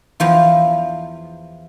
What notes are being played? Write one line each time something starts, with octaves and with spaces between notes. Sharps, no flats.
E2 F3 F4